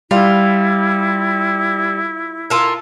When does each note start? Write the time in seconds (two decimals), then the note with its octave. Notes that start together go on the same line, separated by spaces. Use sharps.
0.11 G3 E4 F4
2.50 F4 A4 A#4